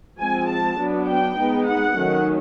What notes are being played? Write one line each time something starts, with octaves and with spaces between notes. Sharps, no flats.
F3 G#3 C4 G#5
A5
F#3 B3 D4
G5
G#3 B3 D#4
F#5
D#3 F#3 A3 C#4